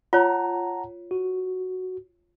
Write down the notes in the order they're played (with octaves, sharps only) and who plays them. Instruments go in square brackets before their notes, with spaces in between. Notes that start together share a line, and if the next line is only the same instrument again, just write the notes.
[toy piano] F4 C#5 [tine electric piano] F#5 A5 A#5
[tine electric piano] F#4